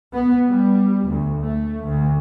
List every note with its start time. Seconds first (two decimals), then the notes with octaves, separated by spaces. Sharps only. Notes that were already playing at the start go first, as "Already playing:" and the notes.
0.13 B3
0.46 G3
1.07 D2
1.42 A3
1.84 D2